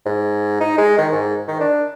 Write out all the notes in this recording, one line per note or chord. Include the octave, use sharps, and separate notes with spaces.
G#2
D#4
G#3
D#3
G#2
D#3
D4